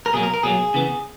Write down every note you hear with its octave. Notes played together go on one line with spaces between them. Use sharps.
A#4
B2 F#3 A#3 G#4
A#4
A#4
B2 F#3 A#3 G#4
C#3 E3 B3